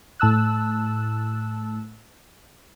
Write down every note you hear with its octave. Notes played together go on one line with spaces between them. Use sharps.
A2 A5 E6 F#6